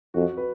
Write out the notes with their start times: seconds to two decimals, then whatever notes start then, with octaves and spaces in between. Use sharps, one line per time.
0.14 F2 F#4
0.37 B4